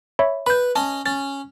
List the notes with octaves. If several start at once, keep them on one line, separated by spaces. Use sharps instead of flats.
C#5 E5 B5
B4 B5 G6
C#4 D#5 A5
C#4 A6